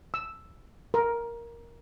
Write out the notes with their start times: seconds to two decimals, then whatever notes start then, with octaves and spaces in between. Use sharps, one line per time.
0.14 E6
0.94 A#4